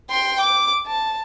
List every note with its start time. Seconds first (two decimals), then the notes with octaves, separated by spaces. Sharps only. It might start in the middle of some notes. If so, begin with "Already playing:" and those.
0.10 G5 C6
0.41 D6
0.87 A5